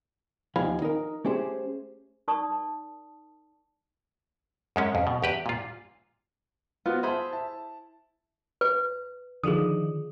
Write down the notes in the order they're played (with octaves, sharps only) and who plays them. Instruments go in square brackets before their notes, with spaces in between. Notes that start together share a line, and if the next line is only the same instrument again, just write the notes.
[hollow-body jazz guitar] D#2 F3 F5 G#5 B5
D#4 A#4
A3 C#4 G4 G#4 C5
[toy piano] D#4 A#4 D5 A5 C#6 D#6
[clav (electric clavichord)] F#2 G#3 C#4
F2
B2
E2 G4 B4
A#2 F4
[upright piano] B3 C5 [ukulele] F4 F#4
[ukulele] G#4 C5 B5 [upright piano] E5 A5
[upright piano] E4 A5
[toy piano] B4
[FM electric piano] D3 D#3 F3 [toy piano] G#4 D#6